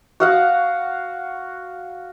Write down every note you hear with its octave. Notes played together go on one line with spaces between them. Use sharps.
F#4 F5 F#5